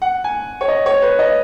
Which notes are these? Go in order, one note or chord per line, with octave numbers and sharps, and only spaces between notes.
F#5
G#5
C#5
D#5
C#5
B4
D#5